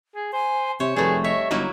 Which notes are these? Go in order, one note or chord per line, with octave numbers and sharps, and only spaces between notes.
G#4
C5 G#5
C3 C5 C#5 E5
F1 G3 A3 G#4 B4
C#5 D#5 E5
G1 F#3 A#3 D#4 E4